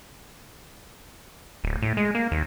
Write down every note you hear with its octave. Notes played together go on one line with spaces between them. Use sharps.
D1
A2
G#3
A#3
D#2